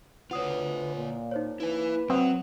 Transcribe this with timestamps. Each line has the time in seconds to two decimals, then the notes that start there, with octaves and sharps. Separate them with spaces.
0.31 D2 F4 B4 C#5 F#5 D#6
0.95 A#2
1.31 D#4 C5 C#5
1.60 A#3 E4 B4 G#5
2.10 F#3 C4 E5 F#5 D#6